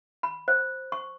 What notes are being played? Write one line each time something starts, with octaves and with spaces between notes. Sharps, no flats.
B5
C5
C#6